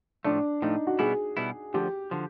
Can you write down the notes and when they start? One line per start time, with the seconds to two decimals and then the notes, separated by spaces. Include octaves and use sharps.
0.24 A2 F3 A3 D4
0.62 A2 F3 A3 D#4
0.87 F#4
0.99 B2 G3 B3 E4 G#4
1.37 B2 G3 B3 E4
1.74 D2 D3 F3 G4
2.11 D3 F3